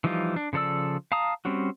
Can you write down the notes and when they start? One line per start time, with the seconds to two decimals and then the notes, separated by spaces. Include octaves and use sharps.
0.04 E3 F3 G3 D#4 F4
0.36 D4
0.53 C#3 F3 A4 D5 E6
1.12 F5 A5 A#5 D#6
1.45 G3 C4 C#4 F#4